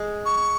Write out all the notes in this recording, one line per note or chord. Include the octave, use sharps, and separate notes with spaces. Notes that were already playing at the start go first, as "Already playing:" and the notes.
Already playing: G#3
C#6